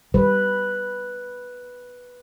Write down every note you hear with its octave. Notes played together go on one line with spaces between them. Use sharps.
G3 B4